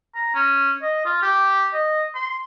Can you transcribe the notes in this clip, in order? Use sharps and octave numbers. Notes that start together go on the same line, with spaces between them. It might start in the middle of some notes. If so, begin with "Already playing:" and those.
A#5
C#4
D#5
F4
G4
D#5
C6